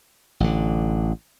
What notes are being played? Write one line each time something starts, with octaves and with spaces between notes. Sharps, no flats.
A1 D3